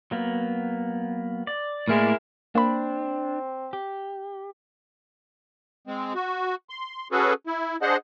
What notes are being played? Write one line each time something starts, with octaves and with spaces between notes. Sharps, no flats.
F#3 A#3 B3
D5
A2 G#3 A#3 B3 E4 A#4
A#3 C4 D4 B5
G4
G#3 C4
F#4
C6
C#4 F#4 G#4 A4 B4
E4
D4 G#4 C5 D#5 F#5